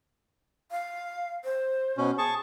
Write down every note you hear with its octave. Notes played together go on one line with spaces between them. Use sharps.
F5
C5
B2 C#4
G#4 A5 C#6